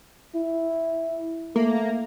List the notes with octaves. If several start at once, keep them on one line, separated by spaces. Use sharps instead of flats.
E4
A3 A#3